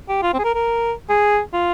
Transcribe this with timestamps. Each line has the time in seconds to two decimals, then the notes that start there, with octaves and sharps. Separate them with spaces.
0.09 G4
0.23 F4
0.34 C4
0.39 G#4
0.44 A#4
0.54 A#4
1.10 G#4
1.53 F4